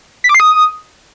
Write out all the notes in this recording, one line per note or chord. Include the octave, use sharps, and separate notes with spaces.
B6
D6
C7
D#6